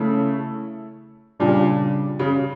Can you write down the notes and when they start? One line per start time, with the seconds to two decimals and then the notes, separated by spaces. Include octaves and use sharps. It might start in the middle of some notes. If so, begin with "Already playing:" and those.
Already playing: C#3 A3 E4 A4
1.39 A#2 C#3 G3 D4
2.19 C#3